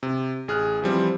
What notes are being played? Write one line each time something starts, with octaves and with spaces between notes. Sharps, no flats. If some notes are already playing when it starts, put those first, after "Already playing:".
C3
A1 G#4 F6 F#6
E3 F3 G3 C4